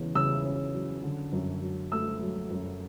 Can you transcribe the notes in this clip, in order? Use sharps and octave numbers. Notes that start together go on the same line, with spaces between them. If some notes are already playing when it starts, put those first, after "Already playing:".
Already playing: E2 C#3
C#3 E6
C#4
F#3
D3
F#2
F#3
A3 E6
F#3
F#2